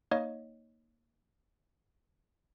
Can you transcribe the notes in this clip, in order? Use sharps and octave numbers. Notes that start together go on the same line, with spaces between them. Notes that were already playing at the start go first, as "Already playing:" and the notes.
A#3 D#4 C#5 D#5